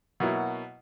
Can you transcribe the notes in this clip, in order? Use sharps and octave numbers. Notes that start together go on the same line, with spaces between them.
B2 F#3 A#3 E4